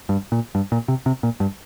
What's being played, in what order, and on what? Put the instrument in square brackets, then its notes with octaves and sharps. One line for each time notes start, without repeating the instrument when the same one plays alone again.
[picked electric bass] G2
A#2
G2
A#2
C3
C3
A#2
G2